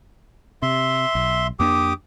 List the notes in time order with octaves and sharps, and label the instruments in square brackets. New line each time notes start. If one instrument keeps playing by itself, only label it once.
[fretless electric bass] C3 [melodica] E5 C6
[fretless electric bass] B1
[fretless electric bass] F2 A#3 D4 [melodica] G4 D6 D#6